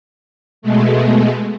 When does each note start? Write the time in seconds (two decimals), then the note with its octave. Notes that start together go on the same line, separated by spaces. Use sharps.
0.62 B2 G#3 A3